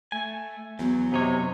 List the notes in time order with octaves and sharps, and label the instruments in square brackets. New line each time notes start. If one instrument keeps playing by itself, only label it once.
[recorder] A3 [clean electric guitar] G#5
[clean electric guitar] E2 [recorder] F#3 [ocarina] B3
[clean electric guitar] F#2 D#4 C#5 [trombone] C3